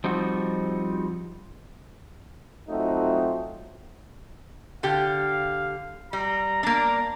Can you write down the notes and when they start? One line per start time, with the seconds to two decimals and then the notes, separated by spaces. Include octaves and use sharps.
0.04 F3 G3 C4 D#4 F#4
2.69 F#3 A3 C4 D#4 F4 F#4
4.83 D3 G4 F5
6.13 G3 A#5
6.63 A#3 D4 A#5